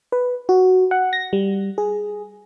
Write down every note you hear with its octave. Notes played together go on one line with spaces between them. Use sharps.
B4
F#4
F#5
A#6
G3
G#4